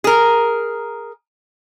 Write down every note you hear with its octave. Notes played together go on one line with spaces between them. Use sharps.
G#4 A#4